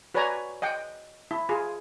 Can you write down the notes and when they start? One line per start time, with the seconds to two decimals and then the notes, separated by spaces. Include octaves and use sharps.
0.14 F#4 B4 C#5 D5 G#5 A#5
0.62 D#5 F#5 G5
1.31 E4
1.49 F4 G#4